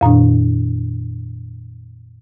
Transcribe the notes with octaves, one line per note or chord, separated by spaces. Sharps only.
F2 A#2 D#3 D4